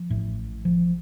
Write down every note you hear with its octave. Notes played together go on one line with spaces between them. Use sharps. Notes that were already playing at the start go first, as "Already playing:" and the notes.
Already playing: F3
A1 A2
F3